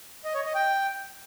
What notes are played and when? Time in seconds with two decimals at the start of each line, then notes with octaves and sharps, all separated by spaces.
0.24 D#5
0.34 C#5
0.45 D#5
0.55 G5